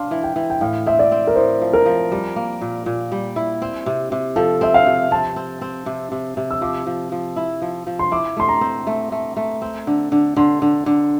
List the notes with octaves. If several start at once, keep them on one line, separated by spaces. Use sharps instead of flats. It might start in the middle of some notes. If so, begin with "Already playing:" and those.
Already playing: D4 F5 C6
E3
G5
E3
G5
A2 F5
C4 E5
D5
C4
A#4
A2 C5
F3
A#4
F3
G3
A#3
A#2
A#2
G3
E4
C4
C3
C3
F3 A4
C4 E5
F5
C3
C4 A5
C4
C4
C3
C3
C3
E6
F3 D6
F3
F3
E4
F3
F3
C6
E4 D6
A3 C6
A#5
C4
A3
A3
A3
C4
D3
D3
D3 C6
D3
D3